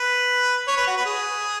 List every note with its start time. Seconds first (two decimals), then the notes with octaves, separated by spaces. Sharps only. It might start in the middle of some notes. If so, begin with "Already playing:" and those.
Already playing: B4
0.68 C#5
0.77 B4
0.87 F#4
0.97 B4
1.06 G#4